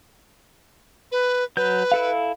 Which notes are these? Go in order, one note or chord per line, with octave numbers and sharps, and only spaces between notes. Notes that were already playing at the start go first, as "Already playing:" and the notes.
B4
F#3 B4 G6
E4 A4 F5